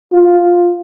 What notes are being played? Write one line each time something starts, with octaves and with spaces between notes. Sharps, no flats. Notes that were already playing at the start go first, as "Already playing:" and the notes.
F4